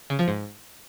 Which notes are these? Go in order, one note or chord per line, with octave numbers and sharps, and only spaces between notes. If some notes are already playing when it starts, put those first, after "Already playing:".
C#3
F3
G#2